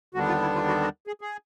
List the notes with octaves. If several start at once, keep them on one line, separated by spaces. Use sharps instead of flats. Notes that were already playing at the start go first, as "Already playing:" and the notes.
D#2 D3 G3 B3 D4 F#4
F4
E4
F4
F#4
F#4
G#4
G#4